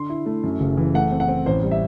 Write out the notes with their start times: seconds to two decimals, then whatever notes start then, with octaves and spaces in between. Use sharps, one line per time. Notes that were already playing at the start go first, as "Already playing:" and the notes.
Already playing: D3 C6
0.09 E4
0.26 A3
0.44 F#2
0.60 F#1
0.77 E3
0.94 A3 F#5
1.12 C4
1.20 F#5
1.28 C4
1.46 A1 C5
1.63 G3
1.71 E5